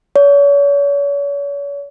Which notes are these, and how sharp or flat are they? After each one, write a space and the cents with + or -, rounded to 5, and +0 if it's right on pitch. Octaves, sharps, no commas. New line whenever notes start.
C#5 +40